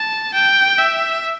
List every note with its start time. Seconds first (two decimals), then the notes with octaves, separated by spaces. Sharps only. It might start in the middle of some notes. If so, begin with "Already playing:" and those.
Already playing: A5
0.34 G5
0.78 E5